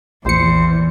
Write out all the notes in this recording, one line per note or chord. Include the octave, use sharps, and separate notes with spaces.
A#1 E2 C5 C#7